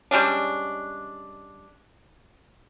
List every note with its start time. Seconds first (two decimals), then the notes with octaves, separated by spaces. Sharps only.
0.11 G3 G#3 C#4 D4